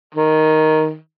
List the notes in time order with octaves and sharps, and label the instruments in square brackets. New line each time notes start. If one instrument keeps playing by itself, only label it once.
[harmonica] D#3